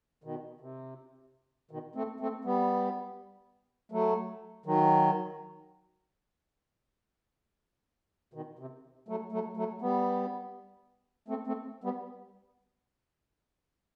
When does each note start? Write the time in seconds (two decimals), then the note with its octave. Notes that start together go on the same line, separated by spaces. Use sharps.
0.24 B2 D#3
0.61 C3
1.71 B2 D#3
1.95 A3 C4
2.20 A3 C4
2.45 G3 B3
3.92 F#3 A3
4.66 D#3 F#3
8.34 B2 D#3
8.59 C3
9.09 F#3 A3
9.32 F#3 A3
9.57 F#3 A3
9.82 G3 B3
11.28 A3 C4
11.47 A3 C4
11.84 G3 B3